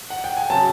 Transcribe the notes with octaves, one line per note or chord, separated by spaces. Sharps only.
F#5
G5
G#5
C#3 F#3 A5